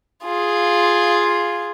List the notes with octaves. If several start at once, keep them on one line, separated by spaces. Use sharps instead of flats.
F4 G#4